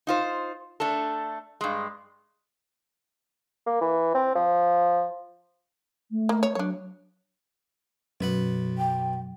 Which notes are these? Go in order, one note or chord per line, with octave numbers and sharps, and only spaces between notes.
D#4 F4 C5
A3 D4 A4
G2 G#3
A#3
E3
C4
F3
A3
A#3
C#5
F#3 D4 C#5
B1 F#2 B4 F#5
G5